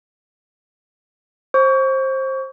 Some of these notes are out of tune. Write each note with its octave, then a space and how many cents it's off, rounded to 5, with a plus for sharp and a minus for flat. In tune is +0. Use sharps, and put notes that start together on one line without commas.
C5 +20 C#6 +30